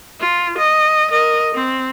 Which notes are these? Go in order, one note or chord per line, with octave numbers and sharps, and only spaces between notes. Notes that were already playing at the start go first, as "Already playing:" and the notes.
F4
D#5
A#4 D#5
C4